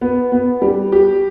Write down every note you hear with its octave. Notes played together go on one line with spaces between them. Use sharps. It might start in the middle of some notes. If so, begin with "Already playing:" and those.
B3
B3
G3
G4